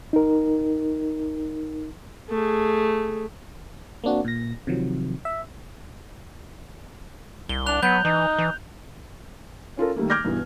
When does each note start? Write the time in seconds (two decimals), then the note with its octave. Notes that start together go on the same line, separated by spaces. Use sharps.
0.13 D#4 A#4
2.30 A3 G#4
4.04 A#3 C4 D4 F#4
4.25 A#2 A#6
4.67 C3 D#3 F3 F#3
5.25 E5
7.49 C2 G7
7.66 D4 F#6 F7
7.83 F#3 B3 G6
8.05 E3 D#4
8.38 E3
9.77 C#4 F4 A4 A#4
9.96 D#3 G3 A3 A#3
10.10 D6 F6 G6 G#6 A#6
10.24 G2 B2 E3 B3